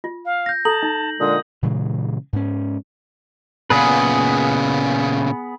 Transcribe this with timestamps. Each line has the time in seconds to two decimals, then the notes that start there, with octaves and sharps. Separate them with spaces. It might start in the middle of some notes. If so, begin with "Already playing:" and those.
0.04 F4
0.25 F5
0.46 G6 A#6
0.65 A4 A5 A#5 F#7
0.83 D#4
1.20 A#2 D3 G#3 D#6
1.63 A#2 C#3 E3 G#3
2.33 G#2 C#4
3.70 A#2 C#3 B3 G#4 B4